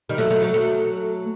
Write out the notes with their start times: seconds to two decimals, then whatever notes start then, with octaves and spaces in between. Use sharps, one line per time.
0.09 D#3 G3
0.18 F#3 A3
0.30 F#3 A3
0.42 F#3 A3
0.54 F#3 A3